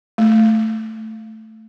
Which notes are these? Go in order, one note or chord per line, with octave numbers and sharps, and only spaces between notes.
A3